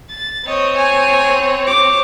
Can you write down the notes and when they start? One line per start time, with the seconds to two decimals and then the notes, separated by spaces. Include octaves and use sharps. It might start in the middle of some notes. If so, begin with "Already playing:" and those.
0.10 A6
0.47 C4 C#5 D#5
0.77 G#5
1.67 D6